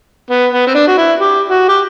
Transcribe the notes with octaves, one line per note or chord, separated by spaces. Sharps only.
B3
B3
C4
D4
F#4
E4
G4
F#4
G4